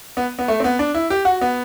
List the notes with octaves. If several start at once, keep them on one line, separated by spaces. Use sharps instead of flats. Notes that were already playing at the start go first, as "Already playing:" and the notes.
B3
B3
A3
C4
B3
D4
E4
G4
F#4
B3